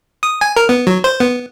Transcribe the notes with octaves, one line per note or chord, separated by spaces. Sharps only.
D#6
G#5
A#4
B3
F#3
C5
B3